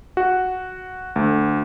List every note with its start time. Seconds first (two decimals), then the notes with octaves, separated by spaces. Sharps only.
0.17 F#4
1.16 D2